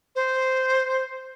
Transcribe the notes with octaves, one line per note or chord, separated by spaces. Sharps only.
C5